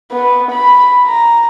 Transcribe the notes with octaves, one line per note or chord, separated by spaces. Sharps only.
B3
B5
A#5